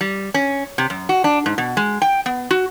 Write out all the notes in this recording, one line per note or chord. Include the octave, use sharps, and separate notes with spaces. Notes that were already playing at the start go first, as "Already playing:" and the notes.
G3
C#4
C3
F#2
F#4
D4
G#2
B2
G#3
G5
B3
F#4